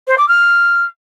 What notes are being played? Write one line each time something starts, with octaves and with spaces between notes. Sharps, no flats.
C5
D6
F6